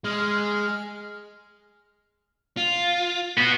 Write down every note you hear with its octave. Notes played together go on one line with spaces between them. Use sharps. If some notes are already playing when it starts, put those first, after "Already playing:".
G#3 F6
F4
B3 F#4